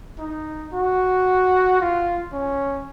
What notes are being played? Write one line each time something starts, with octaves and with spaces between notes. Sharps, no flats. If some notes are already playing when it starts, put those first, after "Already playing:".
D#4
F#4
F4
C#4